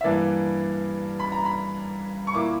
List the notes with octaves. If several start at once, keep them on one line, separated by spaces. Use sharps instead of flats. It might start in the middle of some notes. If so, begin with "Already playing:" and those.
E5
G2 E3 A#3 D4 D5
B5
A#5
B5
C#6
A#2 A#3 E4 D6